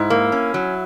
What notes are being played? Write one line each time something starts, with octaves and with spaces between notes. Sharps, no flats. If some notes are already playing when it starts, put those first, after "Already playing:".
Already playing: G#2 E4
A#3
C#4
F#3